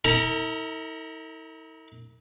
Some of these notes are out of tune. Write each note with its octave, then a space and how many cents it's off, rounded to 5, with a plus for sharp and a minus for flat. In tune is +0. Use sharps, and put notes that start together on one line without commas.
E4 -45 A#4 -45 A#5 +0